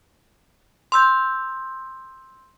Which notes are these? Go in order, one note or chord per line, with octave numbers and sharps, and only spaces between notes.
C6 E6 G6